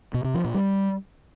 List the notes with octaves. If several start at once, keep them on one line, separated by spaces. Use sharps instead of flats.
B2
C3
F3
A#2
G3